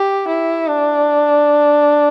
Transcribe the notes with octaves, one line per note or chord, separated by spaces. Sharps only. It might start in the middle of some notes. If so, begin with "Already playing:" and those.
Already playing: G4
E4
D4